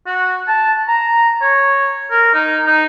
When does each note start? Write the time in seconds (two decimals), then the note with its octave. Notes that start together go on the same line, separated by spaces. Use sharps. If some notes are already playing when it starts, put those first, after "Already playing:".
0.07 F#4
0.47 A5
0.88 A#5
1.41 C#5
2.11 A#4
2.34 D#4
2.66 D#4